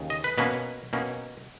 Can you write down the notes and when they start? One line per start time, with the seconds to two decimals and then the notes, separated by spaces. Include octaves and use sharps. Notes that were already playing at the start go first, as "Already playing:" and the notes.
Already playing: D#2 C#3
0.10 D#5
0.24 B4
0.38 B2 A#3 C#4 B4
0.93 B2 A#3 C#4